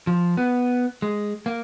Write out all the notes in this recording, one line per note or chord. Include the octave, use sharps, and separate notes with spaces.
F3
B3
G#3
A#3